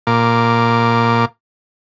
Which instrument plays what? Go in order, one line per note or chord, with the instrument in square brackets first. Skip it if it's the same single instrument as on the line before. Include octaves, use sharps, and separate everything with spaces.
[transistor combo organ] A#2 A#4 D6